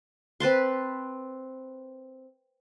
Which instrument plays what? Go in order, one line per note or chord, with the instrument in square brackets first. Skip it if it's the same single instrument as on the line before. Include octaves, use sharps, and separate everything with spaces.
[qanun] C4 B4 A5 C6